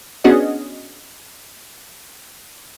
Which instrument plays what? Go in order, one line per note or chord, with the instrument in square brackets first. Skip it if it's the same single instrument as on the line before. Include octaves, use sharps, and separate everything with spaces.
[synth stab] B3 C#4 D4 F#4 G#4 D#5